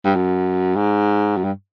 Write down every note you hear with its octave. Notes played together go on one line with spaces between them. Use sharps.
G2
F#2
G#2
F#2
G2